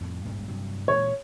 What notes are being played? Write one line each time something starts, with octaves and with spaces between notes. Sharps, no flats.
F2 A2
D#1 G#1 G2
G2 C3 F#3
A#2 E3 G#3 C#5